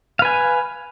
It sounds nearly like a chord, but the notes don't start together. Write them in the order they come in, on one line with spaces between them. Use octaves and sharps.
F5 B4 G#5